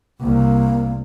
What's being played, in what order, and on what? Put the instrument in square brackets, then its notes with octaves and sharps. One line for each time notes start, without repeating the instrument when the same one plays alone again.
[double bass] C2 [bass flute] A#3